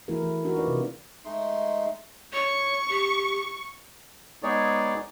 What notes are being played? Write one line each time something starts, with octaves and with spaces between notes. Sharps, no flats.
E3 A3 E4 F#4 G#4 A#4
E3
D4 D#4 F#4 A#4
F4 B4 D5
C3
G#3 A3 D#4 C6
C#5 C#6
G4
G#3 B3 D#4 G#4 C#5 D5